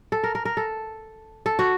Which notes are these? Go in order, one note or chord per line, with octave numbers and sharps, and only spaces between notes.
A4
A#4
A#4
A#4
A4
A4
F#4